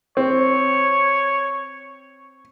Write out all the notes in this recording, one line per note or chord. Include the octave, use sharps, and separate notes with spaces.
C4 C#5